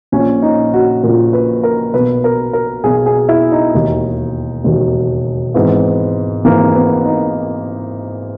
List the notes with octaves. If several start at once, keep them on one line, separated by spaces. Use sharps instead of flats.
A#1 A#2 C#4
D#4
F#4
A#1 A#2 A#4
B4
A#4
B1 B2 B4
A#4
A#4
B1 B2 G#4
G#4
E4
D#4
E1 D#2 D#3
E1 D#2 D#3
G#1 G#2 E3 B3
G#1 G#2 E3 A#3
B3
D#4